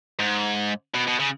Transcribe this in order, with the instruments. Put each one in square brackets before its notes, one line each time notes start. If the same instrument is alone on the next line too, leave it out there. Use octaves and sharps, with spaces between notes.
[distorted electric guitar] G#2
B2
B2
C#3